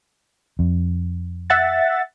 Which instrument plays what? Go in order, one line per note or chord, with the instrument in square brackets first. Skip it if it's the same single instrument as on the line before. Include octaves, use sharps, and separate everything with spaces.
[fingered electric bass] F2
[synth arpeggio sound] E5 F#5 A6